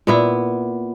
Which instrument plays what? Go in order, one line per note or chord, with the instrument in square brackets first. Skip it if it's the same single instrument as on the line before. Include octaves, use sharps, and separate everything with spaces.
[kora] A#2 B3 E4